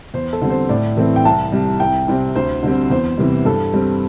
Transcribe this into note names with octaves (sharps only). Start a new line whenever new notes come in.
E2 C5
A4
D3 G3 C4
C5
A2 D5
E3 A3 C4
G5
C2 A5
C3 G3
C2 G5
C3 G3 C4
D2 C5
D3 G3 C4
E2 C5
C3 E3 G3
G2 A4
G3 C4